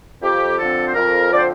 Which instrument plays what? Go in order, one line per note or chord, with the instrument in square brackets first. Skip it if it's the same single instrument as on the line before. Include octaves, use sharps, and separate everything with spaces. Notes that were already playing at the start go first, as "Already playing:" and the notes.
[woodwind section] F2 G4
D3 F3 C4 A4
C5
F2 A#4
D3 F3 C4 D5
C5